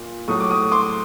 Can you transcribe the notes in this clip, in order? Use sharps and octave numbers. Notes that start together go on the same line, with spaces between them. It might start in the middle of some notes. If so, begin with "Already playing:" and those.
Already playing: A#2
A2 F#3 A3 C#6 D#6
D6
C#6 D#6
C6 D6